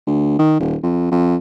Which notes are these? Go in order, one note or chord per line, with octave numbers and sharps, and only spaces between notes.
D2
D#3
D#1
F2
F2